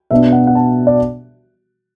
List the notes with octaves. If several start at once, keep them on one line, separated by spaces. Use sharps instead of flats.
B2 B3 D4 E5
F#5
F#5
A5
D5